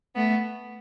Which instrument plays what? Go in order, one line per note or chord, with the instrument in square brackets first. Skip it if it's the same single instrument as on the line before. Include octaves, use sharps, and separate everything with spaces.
[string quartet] A3 B3